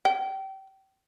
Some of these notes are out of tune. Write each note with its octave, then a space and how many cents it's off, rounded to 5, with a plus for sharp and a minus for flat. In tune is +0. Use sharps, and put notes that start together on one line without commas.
G5 -25